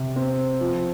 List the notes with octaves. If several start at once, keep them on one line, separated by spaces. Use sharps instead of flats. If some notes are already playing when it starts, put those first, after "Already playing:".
Already playing: C3
C4
F3